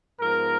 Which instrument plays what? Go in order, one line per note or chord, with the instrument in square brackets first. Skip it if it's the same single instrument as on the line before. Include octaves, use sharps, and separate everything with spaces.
[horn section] G#2 F3 B3 A#4